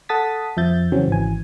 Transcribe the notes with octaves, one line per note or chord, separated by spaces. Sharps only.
A4 F#5 A5 D#6 A6 B6
F2 F3 E5 G6 A6
C#3 E3 F#3 C4 C#4
G#1 E3 G#5